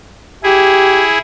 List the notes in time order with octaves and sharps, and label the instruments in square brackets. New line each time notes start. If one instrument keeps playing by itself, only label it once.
[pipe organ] E4 G#4 [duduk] G4